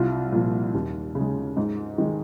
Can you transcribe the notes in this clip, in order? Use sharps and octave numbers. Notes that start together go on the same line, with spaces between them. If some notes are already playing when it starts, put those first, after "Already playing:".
Already playing: C2 F4
A#2 F3
D#2
C#3
G#3
G#2
D#3 G#3